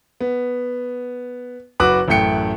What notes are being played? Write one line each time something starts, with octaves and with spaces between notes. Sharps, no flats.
B3
F#1 F#4 B4 D6 F#6 F#7
A1 F#2 A3 G5 C#7